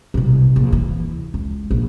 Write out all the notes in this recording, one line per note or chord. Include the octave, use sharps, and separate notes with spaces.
C2 B2
A#1
E3 E4
C#2
A#1